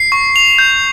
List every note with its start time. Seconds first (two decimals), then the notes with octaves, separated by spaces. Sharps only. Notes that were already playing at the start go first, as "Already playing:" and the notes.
Already playing: C7
0.12 C#6
0.36 F7
0.58 G6